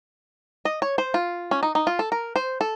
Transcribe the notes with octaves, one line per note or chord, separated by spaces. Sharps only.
D#5
C#5
C5
F4
C#4
D#4
D#4
F4
A4
A#4
C5
A4